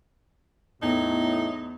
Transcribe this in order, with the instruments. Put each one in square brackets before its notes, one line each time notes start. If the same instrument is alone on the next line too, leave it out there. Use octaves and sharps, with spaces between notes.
[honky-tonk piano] E2 [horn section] A2 [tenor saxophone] D#4